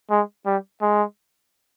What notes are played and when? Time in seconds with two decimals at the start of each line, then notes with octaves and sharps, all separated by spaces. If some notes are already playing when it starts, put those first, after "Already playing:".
0.10 G#3
0.46 G3
0.81 G#3